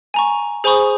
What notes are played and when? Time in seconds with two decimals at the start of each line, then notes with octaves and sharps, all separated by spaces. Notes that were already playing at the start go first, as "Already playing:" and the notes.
0.14 G#5 A#5 C#6
0.64 G#4 C5 G#5 B5 C#6 D#6